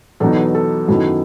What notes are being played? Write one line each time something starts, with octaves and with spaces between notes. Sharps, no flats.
E2 B2 F#3 B3 D#4 A4
A4
F#2 D#3 F#3 B3 E4 A4